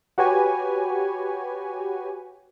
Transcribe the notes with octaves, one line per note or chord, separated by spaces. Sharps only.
F#4 G4 B4 C#5 G#5